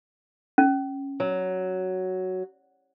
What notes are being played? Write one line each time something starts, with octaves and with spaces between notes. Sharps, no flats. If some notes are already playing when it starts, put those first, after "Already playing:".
C#4
F#3